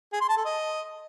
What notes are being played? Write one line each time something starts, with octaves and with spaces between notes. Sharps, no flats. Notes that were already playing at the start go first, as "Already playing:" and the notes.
G#4
C6
A5
A4
D#5